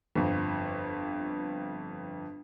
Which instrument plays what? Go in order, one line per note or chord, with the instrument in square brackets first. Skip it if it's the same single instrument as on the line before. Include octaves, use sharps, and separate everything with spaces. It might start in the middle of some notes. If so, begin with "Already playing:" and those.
[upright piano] G1 F2